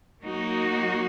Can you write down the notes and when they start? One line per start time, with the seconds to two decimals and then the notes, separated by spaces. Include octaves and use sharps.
0.22 F#3 A#3 D#4 F#4